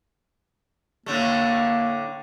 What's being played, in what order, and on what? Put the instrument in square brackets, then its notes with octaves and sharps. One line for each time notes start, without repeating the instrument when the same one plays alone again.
[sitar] A2 D3 A3 [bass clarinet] A#3